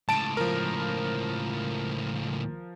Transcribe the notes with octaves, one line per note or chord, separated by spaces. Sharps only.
C#2 A2 A5 D7
F3 A#4